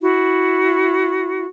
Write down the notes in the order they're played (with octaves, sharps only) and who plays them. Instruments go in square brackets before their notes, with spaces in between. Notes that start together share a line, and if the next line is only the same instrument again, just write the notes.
[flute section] E4 F#4